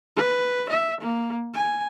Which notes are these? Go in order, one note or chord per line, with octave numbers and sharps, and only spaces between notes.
B4
E5
A#3
G#5